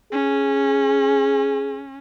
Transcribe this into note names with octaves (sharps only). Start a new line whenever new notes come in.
C#4 G#4